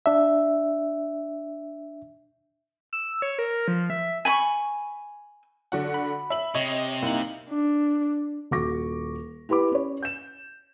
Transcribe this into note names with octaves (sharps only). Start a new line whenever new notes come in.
D4 E5
E6
C#5
A#4
F3
E5
G#5 B5 C#6
D3 F#4 F#5
B5
E5 F#7
C3 C#5 D#5
C2 A#3 D#4 F#7
D4
D#1 F#4 C#6 D6 A#6
E4 G4 B4 B5 D6
C#4 C#5
G6 E7